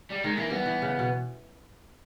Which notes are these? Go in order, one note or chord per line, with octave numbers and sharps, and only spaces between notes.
G3
D#3 G#3
E3 A#3
G3 B3
E3
C#3
B2